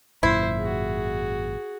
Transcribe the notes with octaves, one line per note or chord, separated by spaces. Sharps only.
G#1 F#2 A#2 E4 C5
F#4 G#4